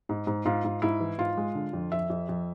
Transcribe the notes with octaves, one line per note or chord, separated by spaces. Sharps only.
G#2
G#2
G#2 F4
G#2
G#2 E4
E3
G#2 F4
G#3
D3
F2
F2 E5
F2
F2